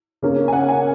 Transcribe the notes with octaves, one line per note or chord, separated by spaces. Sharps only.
C#3 A#3 C#4
G#5
F#5
G#5